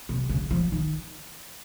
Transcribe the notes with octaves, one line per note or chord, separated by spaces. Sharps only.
C3
C#3
F3
D#3